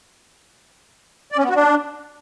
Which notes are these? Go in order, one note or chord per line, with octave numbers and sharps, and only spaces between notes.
D5
C#4
B3
F#4
D4